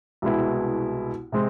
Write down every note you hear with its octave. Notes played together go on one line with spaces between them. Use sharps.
C2 B2 G#3 B3 E4
C3 G#3 C4